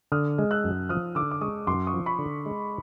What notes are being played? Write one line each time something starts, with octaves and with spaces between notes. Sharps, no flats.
D3 D#6 F6
G#3
E6 F#6
F#2
F3 D#6 F6
D3 D6 E6
D6
G#3 C#6 D#6
F#2 C6 D6
C#6 D#6
F3
B5 C#6
D3
G#3